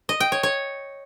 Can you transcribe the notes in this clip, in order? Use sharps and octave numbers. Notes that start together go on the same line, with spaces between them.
D#5
G5
C#5
C#5